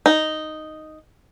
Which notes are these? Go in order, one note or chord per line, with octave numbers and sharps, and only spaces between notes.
D#4